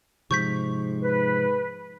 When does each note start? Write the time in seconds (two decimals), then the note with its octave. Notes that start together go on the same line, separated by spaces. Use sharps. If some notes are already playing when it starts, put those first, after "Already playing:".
0.31 G#2 C3 F3 C#6 G6 B6
1.03 B4